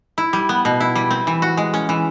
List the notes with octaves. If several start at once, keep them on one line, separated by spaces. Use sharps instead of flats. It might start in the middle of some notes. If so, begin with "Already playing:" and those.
E4
G3
B3
B2
E4
G3
C4
E3
F#4
G#3
C#4
E3